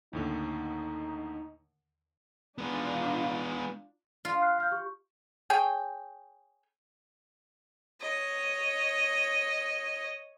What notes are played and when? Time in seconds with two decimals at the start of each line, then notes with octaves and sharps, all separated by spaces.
0.13 D#2 A2 D3 D#4
2.58 G#3 B3 D4 D#4 F4
4.25 F4
4.42 F6 F#6 C7
4.58 F5 F6 G6
4.71 G4 C#6
5.50 G#4 C#5 G5
8.01 C#5 D#5